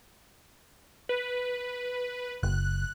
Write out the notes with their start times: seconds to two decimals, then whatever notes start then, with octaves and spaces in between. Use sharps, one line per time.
1.09 B4
2.43 F#1 F#6